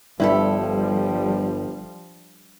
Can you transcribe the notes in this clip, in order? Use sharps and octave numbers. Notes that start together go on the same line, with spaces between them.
G1 G2 F3 G3 E4 G4 A4